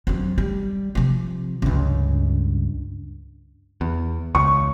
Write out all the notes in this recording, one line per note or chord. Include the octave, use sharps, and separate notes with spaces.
F2 F#3
G3
C3 F3
C#2 G2
E2
C#2 C#6